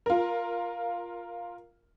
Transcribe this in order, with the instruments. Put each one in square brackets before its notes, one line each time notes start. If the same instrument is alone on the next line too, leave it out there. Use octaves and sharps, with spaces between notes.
[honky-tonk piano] F4 A#4